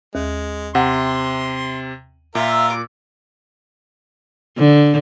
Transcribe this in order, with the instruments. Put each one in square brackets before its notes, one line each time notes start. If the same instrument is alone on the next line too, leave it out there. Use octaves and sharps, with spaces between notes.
[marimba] D#2 [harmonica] G#3
[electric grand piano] C3 [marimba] F#5 [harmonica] C6
[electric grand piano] A#2 [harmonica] F4 A#4 [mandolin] E5
[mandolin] D6
[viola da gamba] D3